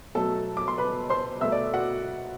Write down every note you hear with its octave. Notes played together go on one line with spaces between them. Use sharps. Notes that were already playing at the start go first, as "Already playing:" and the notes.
B2 F#3 A3 A4 A5
D6
C6
B4 B5
C5 C6
B2 A3 E5 E6
D5 D6
F#4 F#5